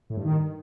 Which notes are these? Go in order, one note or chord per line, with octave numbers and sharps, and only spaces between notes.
A2
G2
D#3